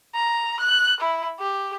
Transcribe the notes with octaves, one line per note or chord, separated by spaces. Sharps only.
A#5
F#6
E4
G4